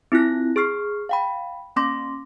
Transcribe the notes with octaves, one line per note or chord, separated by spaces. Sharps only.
C4 E4 F4 F#6 A#6
G#4 C#6 F6 C7
F5 G5 B5
A#3 C#4 C6 D6 A#6